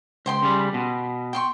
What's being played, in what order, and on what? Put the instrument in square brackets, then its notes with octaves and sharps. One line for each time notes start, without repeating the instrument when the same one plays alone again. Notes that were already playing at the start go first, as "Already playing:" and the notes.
[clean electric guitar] C#2 [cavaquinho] C5 G5 C6
[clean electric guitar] C#3 G3
B2
[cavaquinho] G5 C6 C#6